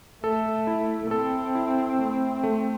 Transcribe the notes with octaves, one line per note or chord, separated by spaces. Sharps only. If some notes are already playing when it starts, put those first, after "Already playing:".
A3 A4
E4
C4 A4
E4
A3
A3